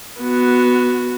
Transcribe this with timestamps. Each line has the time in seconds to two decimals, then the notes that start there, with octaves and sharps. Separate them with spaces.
0.20 B3 F#4